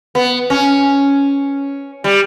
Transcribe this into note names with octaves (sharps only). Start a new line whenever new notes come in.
B3
C#4
G3